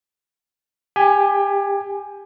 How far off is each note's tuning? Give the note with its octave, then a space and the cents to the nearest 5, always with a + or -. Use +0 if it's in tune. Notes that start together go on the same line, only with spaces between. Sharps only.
G4 +25 G#5 +5